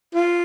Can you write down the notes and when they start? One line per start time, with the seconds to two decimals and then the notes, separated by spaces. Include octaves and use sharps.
0.14 F4